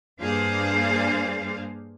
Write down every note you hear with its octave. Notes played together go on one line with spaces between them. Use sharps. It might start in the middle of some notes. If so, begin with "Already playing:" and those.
G2 A#3 D4 G#4 C5 F5